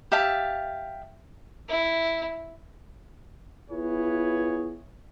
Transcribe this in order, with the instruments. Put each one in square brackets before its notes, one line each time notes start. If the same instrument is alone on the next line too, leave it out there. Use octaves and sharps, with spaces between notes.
[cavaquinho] G4 E5 F5 A5
[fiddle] E4
[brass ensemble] B3 E4 F4 G#4 B4 C#5